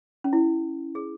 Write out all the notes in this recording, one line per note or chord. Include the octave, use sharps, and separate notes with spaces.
C#4
E4
G#4